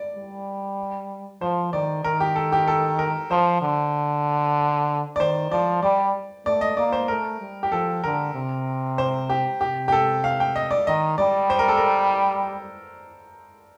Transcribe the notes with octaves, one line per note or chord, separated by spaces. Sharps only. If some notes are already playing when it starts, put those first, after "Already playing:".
Already playing: D5
G3
F3 C5
D#3 D5
D#3 A#4
G4
A4
G4
A4
A#4
F3 C5
D3
D5
D#3 C5
F3 D5
G3 D5
A3 D5
D#5
A#3 D5
C5
A3 A#4
G3
G4
F3 A4
D3 A#4
C3
C5
G4
C3 G4
G4
A4
F5
G5
D#5
D5
D#3 D#5
G3 D5
C5
A#4
A4
A#4